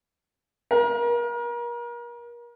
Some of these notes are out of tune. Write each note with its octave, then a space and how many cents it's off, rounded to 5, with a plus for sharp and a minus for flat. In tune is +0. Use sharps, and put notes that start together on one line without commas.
A#4 +35